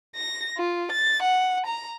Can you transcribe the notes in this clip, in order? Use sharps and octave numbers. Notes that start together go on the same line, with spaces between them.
A#6
F4
A6
F#5
A#5